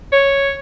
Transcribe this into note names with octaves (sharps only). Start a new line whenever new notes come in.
C#5